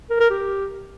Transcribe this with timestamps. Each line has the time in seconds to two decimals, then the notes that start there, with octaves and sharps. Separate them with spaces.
0.10 A#4
0.20 A#4
0.30 G4